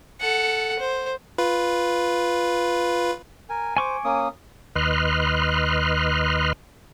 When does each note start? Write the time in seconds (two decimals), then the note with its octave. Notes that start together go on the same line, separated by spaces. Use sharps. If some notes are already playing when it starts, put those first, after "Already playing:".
0.20 A4 F#5
0.79 C5
1.38 F4 B4
3.49 A#4 G#5
3.77 C5 G#5 C#6 D6
4.04 A#3 C#4 D#6
4.75 D#2 B4 D#5 C6 F6 F#6